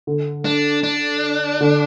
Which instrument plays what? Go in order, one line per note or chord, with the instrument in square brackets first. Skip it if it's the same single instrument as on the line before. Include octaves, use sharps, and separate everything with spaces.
[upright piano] D3
[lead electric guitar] D4
D4
[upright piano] D3